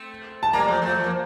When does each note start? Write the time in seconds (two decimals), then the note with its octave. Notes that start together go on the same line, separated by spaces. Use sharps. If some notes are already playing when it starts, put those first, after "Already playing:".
Already playing: A3 C4
0.43 A5
0.53 G3 A#3 A#5
0.67 F3 A3
0.82 F3 A3
0.96 F3 A3
1.04 A#3